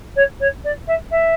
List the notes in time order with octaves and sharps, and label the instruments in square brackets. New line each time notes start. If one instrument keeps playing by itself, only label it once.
[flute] C#5
C#5
D5
E5
E5